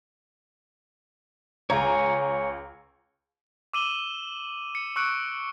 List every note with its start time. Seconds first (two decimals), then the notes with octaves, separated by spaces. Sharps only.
1.70 C#2 C#5 G#5 A#5
3.74 D6 E6 D#7 E7 F#7 G7
4.75 C#7
4.96 C#6 E6 F#6 C#7 D7